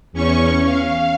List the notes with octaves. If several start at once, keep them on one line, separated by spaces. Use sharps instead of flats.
E2 C#4 C#6
F5